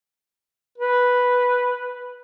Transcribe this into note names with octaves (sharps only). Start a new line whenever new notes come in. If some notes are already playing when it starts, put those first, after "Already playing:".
B4